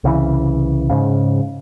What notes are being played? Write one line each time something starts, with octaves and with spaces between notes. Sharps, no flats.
C2 C#3 E3
G#2 C#3